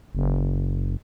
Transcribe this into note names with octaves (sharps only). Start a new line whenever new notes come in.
F#1